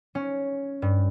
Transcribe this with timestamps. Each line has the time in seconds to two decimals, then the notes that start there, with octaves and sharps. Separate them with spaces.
0.15 C#4
0.82 G2